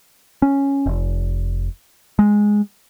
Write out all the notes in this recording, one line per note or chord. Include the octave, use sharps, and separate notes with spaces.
C#4
F1
G#3